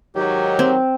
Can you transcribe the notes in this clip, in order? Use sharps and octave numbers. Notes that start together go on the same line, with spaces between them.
G#2 D#3 F#3 G4
C4